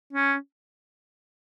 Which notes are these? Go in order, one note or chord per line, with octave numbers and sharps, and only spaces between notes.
C#4